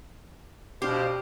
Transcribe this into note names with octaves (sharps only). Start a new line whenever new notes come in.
B2 D4 G4 C5 F5